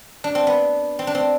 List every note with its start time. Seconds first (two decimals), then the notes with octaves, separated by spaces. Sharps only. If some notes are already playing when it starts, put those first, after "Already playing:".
0.24 D4
0.35 C4
0.47 B3
0.99 C4
1.07 D4
1.15 C4